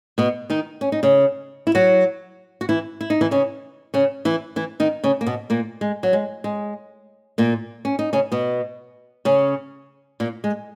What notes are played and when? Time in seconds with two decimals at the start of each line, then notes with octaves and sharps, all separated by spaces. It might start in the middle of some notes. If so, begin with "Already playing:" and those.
0.18 B2 B3
0.50 D#3 D#4
0.81 C#4
0.92 D#4
1.03 C#3 C#4
1.67 E4
1.75 F#3 F#4
2.61 F#4
2.69 E3 E4
3.01 E4
3.10 D#4
3.21 E3 E4
3.31 C#3 C#4
3.94 C#3 C#4
4.25 E3 E4
4.56 E3 E4
4.80 D#3 D#4
5.04 C#3 C#4
5.21 A#3
5.26 B2 B3
5.50 A#2 A#3
5.81 G#3
6.03 F#3
6.13 G#3
6.44 G#3
7.38 A#2 A#3
7.85 C#4
7.99 D#4
8.13 C#3 C#4
8.32 B2 B3
9.25 C#3 C#4
10.20 A#2 A#3
10.44 G#3